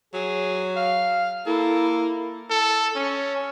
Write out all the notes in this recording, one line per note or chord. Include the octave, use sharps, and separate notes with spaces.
F#3 G#4
F5
A#3 E4 A4
A4
C#4